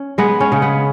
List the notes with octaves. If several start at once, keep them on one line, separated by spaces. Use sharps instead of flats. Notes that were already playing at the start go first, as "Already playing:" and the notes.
Already playing: C#4
G#3 B3
C#4
C#3
B3